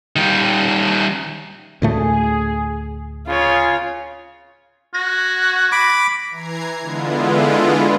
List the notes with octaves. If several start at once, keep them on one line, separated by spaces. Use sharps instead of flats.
D#3 G3
D2 A2 A3 G#4
C#3 F4 C#5
F#4 G#6 A#6
B5 D6
E3 A#5 G#6 C7
D3 G#3 B3 E4 F4